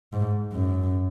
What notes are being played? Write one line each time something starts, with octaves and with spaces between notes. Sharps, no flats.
G#2
F#2